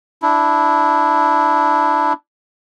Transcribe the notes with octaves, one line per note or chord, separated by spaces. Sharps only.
D4 E4